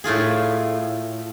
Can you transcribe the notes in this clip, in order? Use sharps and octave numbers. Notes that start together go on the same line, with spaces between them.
A2 A3 F4 G#4